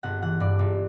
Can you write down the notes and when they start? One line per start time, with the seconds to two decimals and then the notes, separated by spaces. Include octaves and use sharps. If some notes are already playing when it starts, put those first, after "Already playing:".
0.03 G1 F#5
0.22 E3 F#5
0.40 G2 D5
0.59 G1